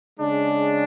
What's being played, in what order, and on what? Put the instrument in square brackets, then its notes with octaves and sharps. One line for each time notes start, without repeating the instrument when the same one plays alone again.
[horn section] C#3 G#3 D4